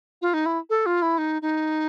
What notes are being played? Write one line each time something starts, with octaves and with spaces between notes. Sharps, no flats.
F4
D#4
E4
A4
F4
E4
D#4
D#4